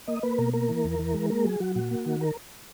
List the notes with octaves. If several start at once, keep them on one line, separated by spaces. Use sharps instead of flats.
A#3 D#5
A#3 B4
B2 A#4
A#3 A#4
E3
E2
E3
G#3
A#3 A#4
F#3 G#4
F#3 F#4
A#2 F#4
A#3
D#3
A#4